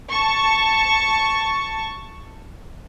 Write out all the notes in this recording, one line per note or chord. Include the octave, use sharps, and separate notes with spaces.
A5 C#6